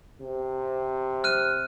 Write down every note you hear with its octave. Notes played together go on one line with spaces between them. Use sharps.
C3
F6 F#6 D#7